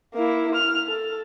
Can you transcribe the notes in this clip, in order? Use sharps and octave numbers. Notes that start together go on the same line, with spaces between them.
A#3 E4
F6
A4